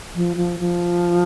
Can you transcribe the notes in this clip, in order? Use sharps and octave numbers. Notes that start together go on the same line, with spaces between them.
F3
F3
F3